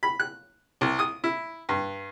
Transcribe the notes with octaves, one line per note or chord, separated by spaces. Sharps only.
B5
F#6
C2
D#6
E4
G2